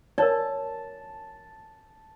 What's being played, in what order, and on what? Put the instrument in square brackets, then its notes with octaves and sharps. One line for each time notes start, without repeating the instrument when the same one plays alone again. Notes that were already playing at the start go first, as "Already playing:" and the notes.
[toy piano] A#4 C#5 D5 [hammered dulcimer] A5